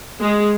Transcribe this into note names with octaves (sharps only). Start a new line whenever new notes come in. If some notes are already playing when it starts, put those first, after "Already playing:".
G#3